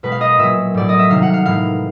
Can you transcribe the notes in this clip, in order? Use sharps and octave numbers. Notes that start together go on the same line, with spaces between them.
B2 G#3 B4
F5
D#5
A#2 F#3 E5
A2 F#3 D5
D#5
E5
C3 D#3 G3 F5
F#5
F5
A2 E3 G#3 F5